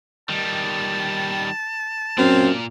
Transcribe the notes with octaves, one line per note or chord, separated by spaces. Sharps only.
D#3 G3 A5
F#2 A#2 C4 F5